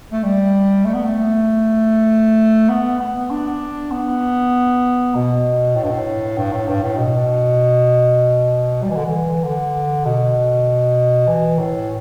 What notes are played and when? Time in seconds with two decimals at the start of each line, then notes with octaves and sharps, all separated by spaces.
0.12 A3
0.24 G3
0.85 A3
0.94 B3
1.04 A3
2.69 B3
3.00 B3
3.31 D4
3.91 B3
5.15 B2
5.76 A2
5.84 G2
5.91 A2
6.38 G2
6.53 A2
6.68 G2
6.83 A2
6.98 B2
8.83 G3
8.90 E3
8.97 D3
9.05 E3
9.44 D3
10.05 B2
11.28 E3
11.59 A2